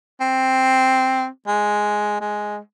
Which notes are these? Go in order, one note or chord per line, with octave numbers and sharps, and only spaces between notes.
C4
G#3
G#3